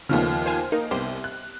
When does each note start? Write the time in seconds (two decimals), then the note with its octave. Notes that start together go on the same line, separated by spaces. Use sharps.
0.09 D#2 C#3 F3 A3 B3 F6
0.46 C5 F5 G#5
0.72 A#3 D#4
0.91 C2 B3 G4 C5
1.24 F#6